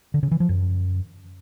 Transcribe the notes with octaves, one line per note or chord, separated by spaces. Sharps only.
D3
C#3
E3
F3
F#2